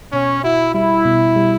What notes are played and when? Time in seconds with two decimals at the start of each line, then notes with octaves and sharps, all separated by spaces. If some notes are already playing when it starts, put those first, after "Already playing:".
0.12 B2 C#4
0.44 E4 F#4
0.74 G3 E4
1.05 B2
1.36 G3